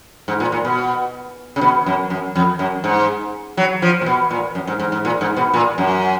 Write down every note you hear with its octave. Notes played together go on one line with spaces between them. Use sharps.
G#2
A#2
A#2
B2
C#3
B2
F#2
F#2
F2
F#2
G#2
F#3
F3
A#2
B2
A#2
F#2
G#2
G#2
G#2
A#2
G#2
B2
A#2
F#2